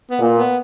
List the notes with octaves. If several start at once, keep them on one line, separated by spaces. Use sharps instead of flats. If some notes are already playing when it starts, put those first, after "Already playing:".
B3
A#2
B3